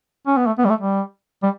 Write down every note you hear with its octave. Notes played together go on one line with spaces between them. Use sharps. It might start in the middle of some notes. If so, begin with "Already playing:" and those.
C#4
B3
A3
B3
G3
A3
G3
G3